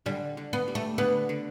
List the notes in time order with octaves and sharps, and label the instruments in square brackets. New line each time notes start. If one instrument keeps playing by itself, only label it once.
[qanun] D3 [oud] G3
[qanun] D3
[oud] B3
[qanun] G3
[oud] A3
[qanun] D3 [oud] B3
[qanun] D3